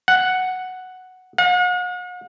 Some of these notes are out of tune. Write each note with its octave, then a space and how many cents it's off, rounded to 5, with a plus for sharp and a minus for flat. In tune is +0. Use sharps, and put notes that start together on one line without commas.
F#5 +0
F#5 -45